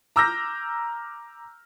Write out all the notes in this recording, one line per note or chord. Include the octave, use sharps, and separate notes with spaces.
A#5 D6 E6 F6 G6 A#6